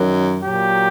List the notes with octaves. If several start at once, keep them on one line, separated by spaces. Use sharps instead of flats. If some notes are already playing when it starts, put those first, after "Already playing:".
Already playing: F#2 D#3 F#3
A#2 F#3 G4